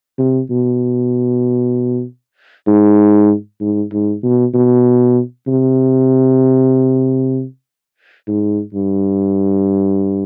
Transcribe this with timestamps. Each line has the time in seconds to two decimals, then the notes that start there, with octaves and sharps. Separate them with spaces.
0.19 C3
0.51 B2
2.67 G#2
3.61 G#2
3.93 G#2
4.23 B2
4.54 B2
5.48 C3
8.28 G#2
8.74 G2